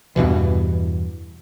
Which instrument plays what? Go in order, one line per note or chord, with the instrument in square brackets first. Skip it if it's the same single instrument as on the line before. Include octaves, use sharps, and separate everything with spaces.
[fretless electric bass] E2 G2 B2 E3